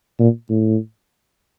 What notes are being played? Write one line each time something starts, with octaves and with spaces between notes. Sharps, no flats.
A#2
A2